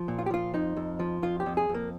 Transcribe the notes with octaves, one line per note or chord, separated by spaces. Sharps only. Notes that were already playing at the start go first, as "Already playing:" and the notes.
Already playing: F3
A#2
F4
G4
F3 F4
F2 D#4
F2
F3
F2 F4
G4
F2
G#4
F2
A#3